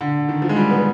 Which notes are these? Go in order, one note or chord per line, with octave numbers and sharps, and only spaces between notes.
D3
D#3
F3
G#3
G3
B3